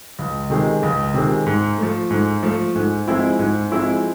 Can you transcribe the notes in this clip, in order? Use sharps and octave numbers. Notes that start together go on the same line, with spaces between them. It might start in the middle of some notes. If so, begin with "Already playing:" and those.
C#2
C3 D#3 G#3
C#2
C3 D#3 G#3
G#2
F3 A3
G#2
F3 A3
G#2
F3 G#3 C4 E4
G#2
F3 G#3 C4 E4